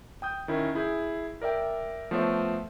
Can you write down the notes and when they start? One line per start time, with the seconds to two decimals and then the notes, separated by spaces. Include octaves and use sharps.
0.22 G5 D#6 G6
0.48 D#3 C#4 E4
0.75 E4 G#4 G6
1.42 A#4 D5 E5 G5
2.11 F3 A3 B3 C5 C#5 E5